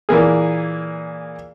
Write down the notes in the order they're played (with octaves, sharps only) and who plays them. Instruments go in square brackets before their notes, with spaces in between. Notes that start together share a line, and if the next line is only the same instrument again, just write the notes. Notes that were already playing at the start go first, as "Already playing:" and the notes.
[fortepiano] A#2 E3 A#3 G#4